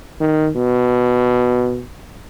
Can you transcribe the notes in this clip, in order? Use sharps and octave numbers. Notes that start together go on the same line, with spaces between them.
D#3
B2